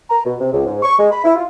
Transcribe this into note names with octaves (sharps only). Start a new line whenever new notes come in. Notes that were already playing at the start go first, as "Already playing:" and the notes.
A#5
B2
C3
C#2
G#2
C#6
G#3
B5
E4
F4